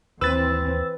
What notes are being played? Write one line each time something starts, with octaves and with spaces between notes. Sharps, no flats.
D#2 E3 C4 B4 E6 A6